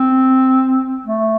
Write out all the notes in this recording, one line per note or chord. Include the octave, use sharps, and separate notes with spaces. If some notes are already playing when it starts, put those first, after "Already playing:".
Already playing: C4
A3